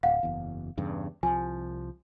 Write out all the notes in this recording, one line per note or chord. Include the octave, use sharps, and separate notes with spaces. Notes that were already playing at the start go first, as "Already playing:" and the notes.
D1 F5 F#5
F#1 E2
E2 G2 C#3
C2 F3 G#5